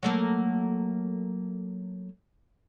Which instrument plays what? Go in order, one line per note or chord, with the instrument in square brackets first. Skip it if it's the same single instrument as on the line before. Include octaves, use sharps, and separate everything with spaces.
[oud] F#3 A3 A#3